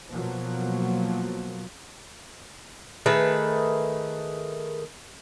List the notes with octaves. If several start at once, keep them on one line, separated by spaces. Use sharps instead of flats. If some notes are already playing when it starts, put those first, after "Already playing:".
B2 F3 F#3 A#3
D#3 A3 G#4 B4